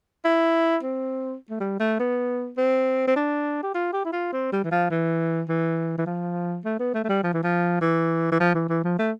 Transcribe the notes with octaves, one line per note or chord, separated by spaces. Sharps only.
E4
C4
A3
G3
A3
B3
C4
C4
D4
G4
F4
G4
E4
F4
C4
G3
E3
F3
E3
E3
E3
F3
A3
B3
A3
A3
G3
F3
E3
F3
E3
E3
F3
E3
E3
F3
A3